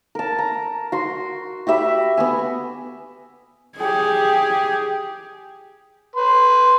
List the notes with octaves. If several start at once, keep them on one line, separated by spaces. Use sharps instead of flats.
A#4 A5
A#5
F#4 C6
F#4 G4 E5 B5
B3 F#4 G#5
G4 G#4
B4 C6